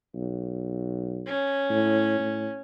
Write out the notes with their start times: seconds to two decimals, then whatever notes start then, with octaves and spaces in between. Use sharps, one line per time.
0.15 B1
1.26 C#4
1.70 A2
2.19 A2